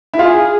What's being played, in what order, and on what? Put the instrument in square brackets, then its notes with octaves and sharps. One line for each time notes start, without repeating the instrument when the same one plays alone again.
[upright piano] E4
[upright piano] F4 [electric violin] G#4